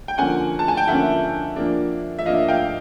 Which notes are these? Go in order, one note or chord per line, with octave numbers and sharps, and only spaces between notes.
G5
D3 F3 A#3 C#4 F#5 G#5
A5
G#5
G5
D3 F3 A#3 C#4 E5 F#5
F3 A#3 D4
E5
F3 A#3 D4 D#5 F5
F5 G5